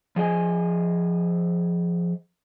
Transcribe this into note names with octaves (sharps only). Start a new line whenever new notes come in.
F3 G#4 D#5 G#5